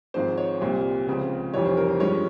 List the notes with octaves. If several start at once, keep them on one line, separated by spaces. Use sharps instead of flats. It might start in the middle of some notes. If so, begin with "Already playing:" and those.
G#1 G#2 F3 G#3 C4 C5
C#5
C2 A#2 G3 C4
C#2 C#3 F3 C4
F1 F2 E3 G3 C#5
C5
A#4
C5
G2 F3 G#3 C#4 C#5